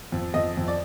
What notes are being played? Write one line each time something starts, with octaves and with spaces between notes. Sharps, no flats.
F2
F2 D#5
F2
D5